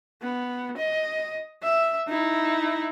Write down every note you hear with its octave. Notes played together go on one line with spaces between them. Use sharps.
B3
D#5
E5
D#4 E4